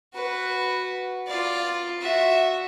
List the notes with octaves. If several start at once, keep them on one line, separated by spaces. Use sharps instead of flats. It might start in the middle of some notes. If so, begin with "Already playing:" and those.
F#4 B4
F4 D5
F#4 E5